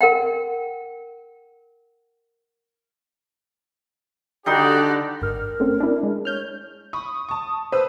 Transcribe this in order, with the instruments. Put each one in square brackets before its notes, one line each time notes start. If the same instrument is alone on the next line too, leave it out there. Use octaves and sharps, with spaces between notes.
[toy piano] A#4 F#5 G5
[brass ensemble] D3 G4 [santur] G3 D#4 C6 [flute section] D4 F#4 D5
[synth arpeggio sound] G#1 F6 [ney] A#4
[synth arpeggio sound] A3 C4 C#4
D4 E4
G#3
[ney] C#5 [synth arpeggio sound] F6 G6
[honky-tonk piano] B5 C#6 [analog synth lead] D#6
[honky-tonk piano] A5 C#6
[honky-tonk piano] B4 D#6 E6 [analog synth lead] C5